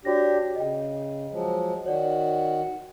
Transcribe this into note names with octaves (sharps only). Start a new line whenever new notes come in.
D4 F#4 G4 C#5 A#6
C#3 D#5 G5
F3 F#3 G#3
D#3 F#4 C#5 D5